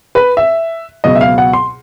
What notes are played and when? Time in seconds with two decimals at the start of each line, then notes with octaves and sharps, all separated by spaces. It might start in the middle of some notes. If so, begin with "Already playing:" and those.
0.15 B4
0.37 E5
1.04 C#2 B2 F#3 D#5
1.15 E5
1.21 F5
1.38 F#5
1.53 C6